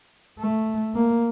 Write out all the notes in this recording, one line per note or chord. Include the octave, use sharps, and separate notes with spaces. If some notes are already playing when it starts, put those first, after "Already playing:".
A3
A#3